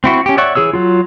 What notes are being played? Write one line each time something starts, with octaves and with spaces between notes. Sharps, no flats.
C4 E4 F#4
C#4 G4
C#5 D5 E5 F#5 C#6
E3 G#4 C#5 E6
F#3 F4